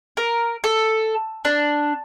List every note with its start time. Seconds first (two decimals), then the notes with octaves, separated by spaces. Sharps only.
0.17 A#4
0.64 A4
1.45 D4